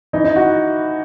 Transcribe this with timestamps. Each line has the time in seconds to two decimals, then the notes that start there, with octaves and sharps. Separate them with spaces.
0.13 E3 D#4
0.24 D#4
0.36 F#4